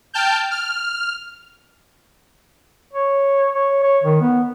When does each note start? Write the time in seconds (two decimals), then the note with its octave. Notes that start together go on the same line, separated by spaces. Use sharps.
0.14 G5 A5 F6 G6
0.51 F6
2.93 C#5
3.55 C#5
3.83 C#5
4.03 D#3
4.21 B3